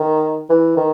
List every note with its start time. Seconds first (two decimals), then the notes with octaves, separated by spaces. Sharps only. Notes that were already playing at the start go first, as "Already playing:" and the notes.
Already playing: D#3
0.50 E3
0.77 D#3